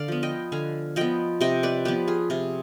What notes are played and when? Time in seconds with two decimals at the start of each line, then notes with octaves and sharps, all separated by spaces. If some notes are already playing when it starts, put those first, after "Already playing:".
Already playing: D3 D5 F5
0.08 F3 B3
0.23 D#5 G5
0.52 D3 F5 G#5
0.96 F3 B3 D#5 G5
1.41 C3 D#5 G5
1.63 B4 D5
1.85 F3 B3 G4 B4
2.07 F4 G#4
2.30 C3 F4 G#4